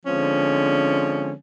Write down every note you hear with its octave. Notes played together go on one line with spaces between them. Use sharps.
D3 F3 G#3 C4 C#4